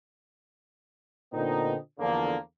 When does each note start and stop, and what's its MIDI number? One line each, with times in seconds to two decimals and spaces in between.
1.33 1.75 46
1.33 1.75 50
1.33 1.75 59
1.33 1.75 60
1.33 1.75 62
1.33 1.75 63
1.99 2.35 40
1.99 2.35 50
1.99 2.35 53
1.99 2.35 58